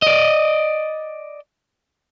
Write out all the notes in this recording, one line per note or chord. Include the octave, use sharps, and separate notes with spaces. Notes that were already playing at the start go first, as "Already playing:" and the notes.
D5 D#5